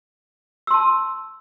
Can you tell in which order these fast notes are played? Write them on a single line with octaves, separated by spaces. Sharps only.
E6 C6 A5